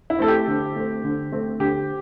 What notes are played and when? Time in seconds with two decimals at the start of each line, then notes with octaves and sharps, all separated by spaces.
0.10 E4
0.19 A3 C4 A4
0.28 G4
0.48 D3
0.76 A3 C4
1.04 D3
1.32 A3 C4
1.60 D3 G4